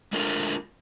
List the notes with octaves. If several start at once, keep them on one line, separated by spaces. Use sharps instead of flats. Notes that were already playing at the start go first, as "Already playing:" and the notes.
G#3 A3 D4 F4 A#4